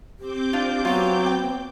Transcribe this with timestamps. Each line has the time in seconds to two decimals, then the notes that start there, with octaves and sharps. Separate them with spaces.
0.19 C4 G4 D6 G6
0.53 D4 F4
0.85 F#3 B3 F4 G4
1.26 G5